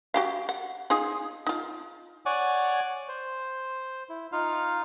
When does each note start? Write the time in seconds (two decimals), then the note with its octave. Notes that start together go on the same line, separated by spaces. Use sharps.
0.14 F#4 G4 F5
0.49 F#5
0.90 D#4 F4 G#4
1.47 D#4 F4
2.26 C#5 D5 F#5 G#5 C#6 D6
3.08 C5
4.09 E4
4.32 D#4 F4 F5